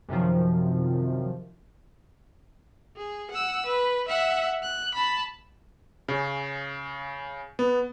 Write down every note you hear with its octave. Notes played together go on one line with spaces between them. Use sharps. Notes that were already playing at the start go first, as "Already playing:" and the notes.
F#2 C3 D#3 F3
G#4
F#5 E6
B4
E5 F#5
F#6
A5 B5
C#3
B3